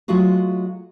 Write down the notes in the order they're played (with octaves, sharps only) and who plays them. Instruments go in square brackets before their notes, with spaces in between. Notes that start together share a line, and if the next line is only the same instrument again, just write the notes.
[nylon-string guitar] F#3 G#3 A3 F4 F#4 G#4